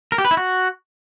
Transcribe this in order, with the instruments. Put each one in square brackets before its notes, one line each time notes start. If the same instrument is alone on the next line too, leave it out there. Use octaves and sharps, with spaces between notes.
[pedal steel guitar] A#4
G4
B4
E4
F#4